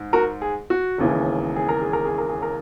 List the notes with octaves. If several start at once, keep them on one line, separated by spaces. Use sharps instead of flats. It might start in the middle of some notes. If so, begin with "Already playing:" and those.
Already playing: G#2
F#4 A#4
G#4
F#4
E1 D#2 C#3 E3
G#4
A#4
G#4
A#4
G#4
A#4
G#4
A#4